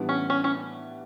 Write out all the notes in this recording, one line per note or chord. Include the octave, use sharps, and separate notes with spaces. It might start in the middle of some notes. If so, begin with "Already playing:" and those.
Already playing: A2 E3 G3 B3 D4
C#4
C#4
C#4